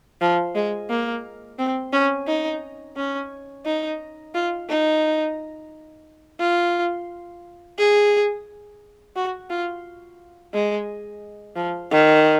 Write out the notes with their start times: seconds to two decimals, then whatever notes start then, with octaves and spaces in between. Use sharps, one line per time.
0.21 F3
0.55 G#3
0.89 A#3
1.59 C4
1.92 C#4
2.27 D#4
2.96 C#4
3.65 D#4
4.34 F4
4.69 D#4
6.40 F4
7.78 G#4
9.16 F#4
9.50 F4
10.53 G#3
11.56 F3
11.91 D#3